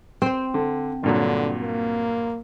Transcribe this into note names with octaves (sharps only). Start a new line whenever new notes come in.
C4 C5 G5
D3
G2 A#2 D3 F#3
A#3